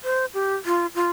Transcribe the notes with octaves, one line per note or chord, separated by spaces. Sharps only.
C5
G4
F4
F4